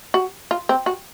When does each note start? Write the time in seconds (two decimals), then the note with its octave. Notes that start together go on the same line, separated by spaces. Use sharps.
0.14 F#4
0.51 F4
0.69 C4
0.86 F#4